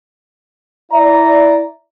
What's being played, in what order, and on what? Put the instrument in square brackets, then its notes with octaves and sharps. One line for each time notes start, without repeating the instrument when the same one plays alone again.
[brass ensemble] E4 D5 E5 A#5